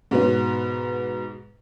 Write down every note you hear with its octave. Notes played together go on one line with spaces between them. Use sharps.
G#2 B2 B4